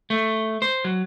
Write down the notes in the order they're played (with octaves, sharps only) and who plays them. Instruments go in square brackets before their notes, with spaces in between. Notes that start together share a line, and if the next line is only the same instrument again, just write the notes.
[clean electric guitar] A3
C5
F#3